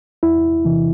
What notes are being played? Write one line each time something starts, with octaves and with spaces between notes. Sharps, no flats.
E2 E4
C3 E3